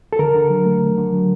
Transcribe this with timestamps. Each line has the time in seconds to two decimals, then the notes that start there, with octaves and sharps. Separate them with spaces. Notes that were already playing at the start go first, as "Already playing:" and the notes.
0.13 A4
0.19 D3 A#4
0.35 D3
0.50 F#3
0.65 A3
0.81 D3
0.97 D3
1.12 F#3